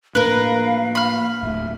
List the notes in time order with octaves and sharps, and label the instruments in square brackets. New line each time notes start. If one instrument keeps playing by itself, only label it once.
[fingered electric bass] A2 A#3 D4 [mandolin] A#4 B4 [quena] F5
[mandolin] B5 F6
[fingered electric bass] D1 G1 A2 [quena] E5